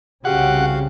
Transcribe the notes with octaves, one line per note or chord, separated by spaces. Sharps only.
C2 C#3 F#4 G4 F5 F#5